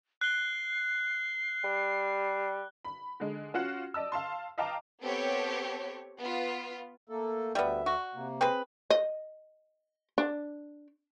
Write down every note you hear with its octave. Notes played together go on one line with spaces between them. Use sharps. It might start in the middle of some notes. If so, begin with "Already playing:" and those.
F#6 C7 G7
G3
B5
D3 G#3
C#4 F4 F#4 F#5
D5 D#5 A5 E6
F5 A5 C6
D#5 F5 G5 A5 A#5 D6
B3 C4 G4 A4 C#5
B3 F4
A3 A#3 A4
D2 G3 B3 E5
F#4
C3 A#3
C4 G#4 B4
D#5
D4